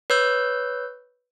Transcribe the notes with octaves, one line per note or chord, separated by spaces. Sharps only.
B4 C#5 E6 G6